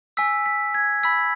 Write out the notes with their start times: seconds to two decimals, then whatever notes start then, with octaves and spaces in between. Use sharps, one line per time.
0.17 G#5 E6 B6
0.46 B6
0.74 G#6
1.03 B5 E6 B6